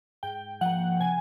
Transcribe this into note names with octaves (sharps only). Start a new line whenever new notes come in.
G#2 G5
F3 A#3 F#5
C3 G#5